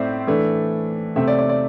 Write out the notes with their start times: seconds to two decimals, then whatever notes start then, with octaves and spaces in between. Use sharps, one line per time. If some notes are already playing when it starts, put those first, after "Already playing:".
Already playing: A2 A3 C4 C5 D5 E5
0.27 E3 A3 D4
1.16 C3 A3 C4 E5
1.27 D5
1.39 D5
1.49 D5